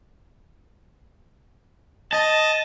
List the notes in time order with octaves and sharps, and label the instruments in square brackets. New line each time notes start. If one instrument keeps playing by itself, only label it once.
[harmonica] D#5 [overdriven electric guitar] A5